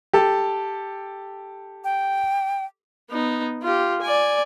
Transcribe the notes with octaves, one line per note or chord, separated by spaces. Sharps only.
G4 A4
G5
B3 D#4
F4 G4
D5 G#5